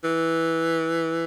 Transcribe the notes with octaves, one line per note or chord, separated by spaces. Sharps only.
E3